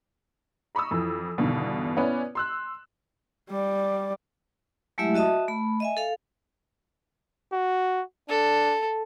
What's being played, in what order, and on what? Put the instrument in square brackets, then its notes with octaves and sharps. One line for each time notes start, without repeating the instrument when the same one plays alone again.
[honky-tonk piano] A#5 B5 C#6 D#6 E6
F2 E3
E2 G2 B2 D3 D#3
B3 C#4 E4 B4 D5
C6 E6 F#6
[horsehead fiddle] G3 D5
[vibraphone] F#3 G#3 A3 E4 G4 E5
F#4 D#5 E5 A5 D#6
A3 B5
D#5 E5 G#5
A4 F5
[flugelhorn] F#4
[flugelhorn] D4 [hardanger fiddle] A4